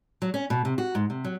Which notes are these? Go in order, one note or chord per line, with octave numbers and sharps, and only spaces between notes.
F#3
C#4
B2
C3
F#4
G#2
C3
F#3